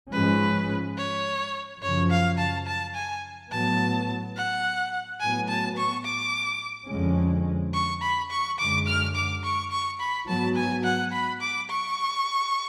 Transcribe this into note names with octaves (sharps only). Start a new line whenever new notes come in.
G#2 F3 G#3 C#4 B4
C#5
F#2 C#3 F3 C#5
F5
A5
A5
G#5
A2 F#3 B3 A5
F#5
A2 F#3 B3 G#5
A5
C#6
D6
F2 D3 G#3 C#4
C#6
B5
C#6
F#2 D3 G#3 D6
F6
D6
C#6
C#6
B5
G#2 F#3 B3 A5
G#5
F#5
B5
D6
C#6